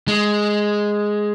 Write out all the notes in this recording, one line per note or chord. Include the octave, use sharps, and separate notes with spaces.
G#3